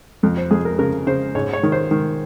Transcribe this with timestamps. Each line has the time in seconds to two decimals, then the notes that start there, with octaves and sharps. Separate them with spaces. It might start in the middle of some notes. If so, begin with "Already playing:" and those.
0.23 F2
0.37 C5
0.51 F2 G#4
0.65 A#4
0.79 C#3 A#4
1.07 C#3 C5
1.35 G#2 C#5
1.53 C#5
1.63 D#3
1.72 C5
1.91 D#3